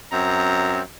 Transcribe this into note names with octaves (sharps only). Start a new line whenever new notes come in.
F#2 C4 A#5